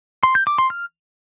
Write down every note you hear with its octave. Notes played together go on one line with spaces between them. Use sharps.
C6
G6
D6
C6
F6